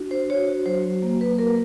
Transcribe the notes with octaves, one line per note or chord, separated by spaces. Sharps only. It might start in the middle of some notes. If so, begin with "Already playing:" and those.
Already playing: D4 F#4
C5
F#4 C#5
F#3 C5
A#3
B4
A#3 A#4